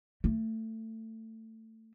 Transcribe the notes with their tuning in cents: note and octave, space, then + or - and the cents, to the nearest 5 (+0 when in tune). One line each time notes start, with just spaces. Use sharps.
A3 +20